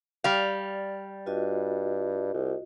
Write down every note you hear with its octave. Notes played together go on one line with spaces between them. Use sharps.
G3 D5 F5
G2 F4 F#4 D#5
C2